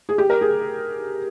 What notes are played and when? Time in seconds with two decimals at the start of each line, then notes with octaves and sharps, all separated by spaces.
0.09 G#4
0.18 G4
0.30 A#4
0.41 G#4